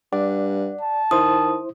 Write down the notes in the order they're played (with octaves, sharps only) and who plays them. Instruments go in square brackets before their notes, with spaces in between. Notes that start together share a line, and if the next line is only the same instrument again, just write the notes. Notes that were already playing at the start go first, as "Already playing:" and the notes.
[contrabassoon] G2 [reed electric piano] D5 [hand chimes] F#5
[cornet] A5
[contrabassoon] D#3 [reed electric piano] E4 C5 [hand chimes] D#6